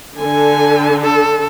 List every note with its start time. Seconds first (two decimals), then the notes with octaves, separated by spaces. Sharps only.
0.19 D3 G#5
1.02 A4